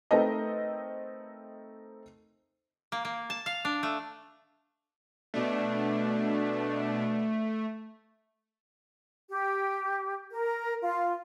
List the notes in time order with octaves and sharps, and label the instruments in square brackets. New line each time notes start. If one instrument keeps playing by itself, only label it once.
[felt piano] A3 C4 D#4 A#4 B4 D#5
[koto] A#3
A#3
A5
F5
D4
A3
[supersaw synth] B2 D4 [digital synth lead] A3
[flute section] G4
A#4
F4